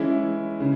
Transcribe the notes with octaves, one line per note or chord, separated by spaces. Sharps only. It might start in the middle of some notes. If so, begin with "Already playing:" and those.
Already playing: E3 G#3 C#4 E4
C#3